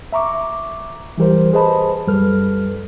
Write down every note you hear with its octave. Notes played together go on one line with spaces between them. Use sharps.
E5 A#5 C#6 D6
E3 G3 G4 A#4 C5
G#4 B4 C5 D#5 A5 B5
F#2 G3 A4 B4 F6